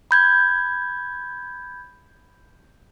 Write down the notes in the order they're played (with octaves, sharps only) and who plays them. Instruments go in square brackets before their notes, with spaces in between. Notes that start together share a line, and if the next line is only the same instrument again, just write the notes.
[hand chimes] B5 G6 G#6